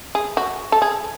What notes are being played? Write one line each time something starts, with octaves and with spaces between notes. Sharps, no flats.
G#4
F#4
A4
G#4